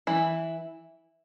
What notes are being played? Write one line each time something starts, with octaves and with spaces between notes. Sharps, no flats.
E3 E4